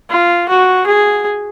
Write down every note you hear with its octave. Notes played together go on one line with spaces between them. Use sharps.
F4
F#4
G#4